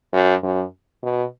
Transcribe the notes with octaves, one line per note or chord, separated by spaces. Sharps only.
F#2
F#2
B2